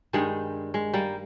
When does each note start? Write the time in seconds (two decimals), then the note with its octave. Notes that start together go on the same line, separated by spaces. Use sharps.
0.13 G2 D#3 G3 G#3
0.74 G#3
0.94 G3 A#3